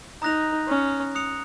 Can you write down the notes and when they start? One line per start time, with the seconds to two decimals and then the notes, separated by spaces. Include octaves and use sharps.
0.22 D#4 A#5 D#6 F#6 A#6 F7
0.68 C#4
1.15 D#6 F#6 C#7 F7